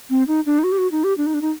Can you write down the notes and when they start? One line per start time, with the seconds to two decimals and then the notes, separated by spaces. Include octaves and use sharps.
0.10 C4
0.28 D#4
0.46 D4
0.59 D#4
0.64 F#4
0.72 G4
0.78 F#4
0.92 D#4
1.04 G4
1.17 D4
1.26 D#4
1.34 D4
1.42 D#4